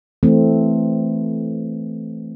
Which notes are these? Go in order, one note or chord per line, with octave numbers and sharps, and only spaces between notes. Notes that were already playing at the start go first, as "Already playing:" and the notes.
E3 A3 C4